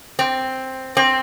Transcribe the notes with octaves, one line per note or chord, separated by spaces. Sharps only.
C4
C4